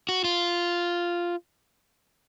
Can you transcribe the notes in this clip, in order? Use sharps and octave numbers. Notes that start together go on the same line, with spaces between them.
F#4
F4